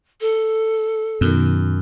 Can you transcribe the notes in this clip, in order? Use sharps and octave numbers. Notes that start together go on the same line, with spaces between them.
A4
F#2 B2 D#3